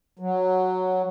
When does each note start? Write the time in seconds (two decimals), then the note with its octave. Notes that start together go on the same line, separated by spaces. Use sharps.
0.19 F#3